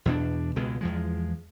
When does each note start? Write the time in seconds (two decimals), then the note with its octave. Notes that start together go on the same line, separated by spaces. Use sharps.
0.05 E2 B2 D4
0.56 C#2 B2 G#3
0.81 E2 F3 G#3